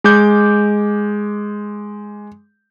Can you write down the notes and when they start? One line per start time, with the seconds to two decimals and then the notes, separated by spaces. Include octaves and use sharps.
0.04 G#3 D6 G6